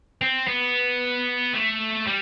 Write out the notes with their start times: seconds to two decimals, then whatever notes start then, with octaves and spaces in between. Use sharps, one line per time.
0.22 C4
0.48 B3
1.53 A3
2.07 G3